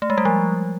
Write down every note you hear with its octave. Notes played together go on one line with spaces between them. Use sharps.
A3
G#3
G3
F3